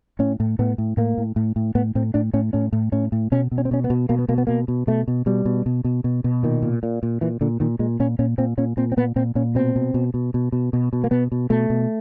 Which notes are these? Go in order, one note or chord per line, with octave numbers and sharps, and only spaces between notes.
A2 C#4
A2
A2 B3
A2
A2 A#3
A2
A2
A2
A2 B3
A2 C4
A2 D4
A2 C#4
A2 C#4
A2
A2 C#4
A2
B2 C#4
B2
C#4
C4
B2 C#4
B3
B2
B2 A#3
B3
B2 A#3
B3
B2 A#3
B2
B2 A3
B2
B2 G3
B2
B2
B2
B2
B2
A#2 D#3
A#2
A#2
A#2
A#2 E3
A#2 D3
A#2 D#3
A#2 G#3
A#2 C#4
A#2 C#4
A#2 C4
A#2 C#4
A#2 C4
C4
A#2 B3
A#2 C4
A#2 C#4
B2 C4
B2
B2
B2
B2
B2
B2
B2
A#3
B2 B3
B2
B2 A3
B2